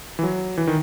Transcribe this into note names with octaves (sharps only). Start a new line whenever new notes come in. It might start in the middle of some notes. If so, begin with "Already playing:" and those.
E3
F#3
E3
D#3